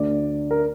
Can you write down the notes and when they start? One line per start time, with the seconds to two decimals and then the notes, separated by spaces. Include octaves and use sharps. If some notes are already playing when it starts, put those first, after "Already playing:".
Already playing: D2 D3 D5
0.51 A#4